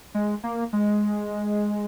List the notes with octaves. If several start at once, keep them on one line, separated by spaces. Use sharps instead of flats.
G#3
A#3
G#3